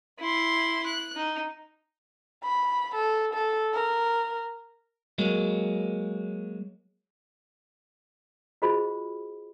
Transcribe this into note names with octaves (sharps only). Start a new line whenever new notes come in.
E4 C6
F#6
D#4
B5
A4
A4
A#4
F#3 G#3 A#3
F4 F#4 G#4 C5 D#5 B5